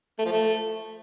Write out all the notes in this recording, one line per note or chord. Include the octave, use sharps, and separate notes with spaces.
A3
F3
A3